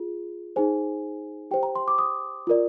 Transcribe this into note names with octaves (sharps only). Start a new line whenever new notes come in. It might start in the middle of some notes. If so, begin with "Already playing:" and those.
Already playing: F4 G#4
D#4 G#4 C5 G#5
G4 C5 G5
A#5
C6
D6
D#6
F4 A#4 D5